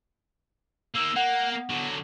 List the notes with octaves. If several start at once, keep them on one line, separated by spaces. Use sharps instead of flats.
A#3 D#4 E6
A#3 F#5
B3
D3 F#3